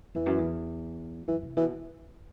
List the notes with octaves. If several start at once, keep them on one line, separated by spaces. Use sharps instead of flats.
E2 E3
F#2
E2
F#2 E3
C3
B2 E3